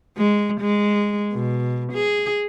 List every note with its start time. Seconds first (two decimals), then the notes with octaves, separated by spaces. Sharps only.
0.17 G#3
0.61 G#3
1.33 B2
1.93 G#4